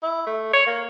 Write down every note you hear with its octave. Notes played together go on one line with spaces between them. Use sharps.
E4
A3
C#5
A#3